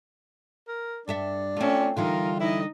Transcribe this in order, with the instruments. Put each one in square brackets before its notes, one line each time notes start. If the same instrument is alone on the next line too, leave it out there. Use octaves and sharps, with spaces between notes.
[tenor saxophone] A#4
[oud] G2 A4 E5 [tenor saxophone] D4
[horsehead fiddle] A3 C#4 [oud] C4 F4
[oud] D3 E3 G3 [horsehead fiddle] D#4 A#4 [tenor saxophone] F4
[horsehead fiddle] D#4 D#5 [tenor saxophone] E4